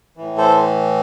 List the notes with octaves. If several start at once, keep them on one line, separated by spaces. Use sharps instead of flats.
A2 E3
A4 C5